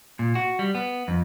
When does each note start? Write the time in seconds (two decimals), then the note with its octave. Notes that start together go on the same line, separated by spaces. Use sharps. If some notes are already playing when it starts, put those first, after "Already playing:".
0.19 A#2
0.35 F#4
0.59 G3
0.75 B3
1.08 F2